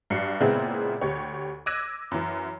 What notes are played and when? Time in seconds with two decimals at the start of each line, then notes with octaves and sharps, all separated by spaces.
0.10 G2 F#3 C7 C#7
0.40 A#2 C#3 G#3 B3 C4 E4
1.01 D2 G4 C#5
1.66 D6 E6 F#6 G#6 A#6 D#7
2.11 F#2 E3